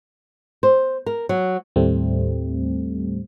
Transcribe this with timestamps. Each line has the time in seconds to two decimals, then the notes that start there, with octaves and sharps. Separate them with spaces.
0.63 C5
1.06 A#4
1.29 F#3
1.76 D#2 A2 G3 A3 C4